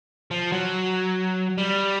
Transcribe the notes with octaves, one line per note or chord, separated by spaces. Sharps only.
F3
F#3
G3